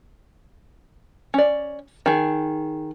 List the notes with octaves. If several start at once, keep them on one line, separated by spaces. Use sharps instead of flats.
C#4 D5
D#3 G#4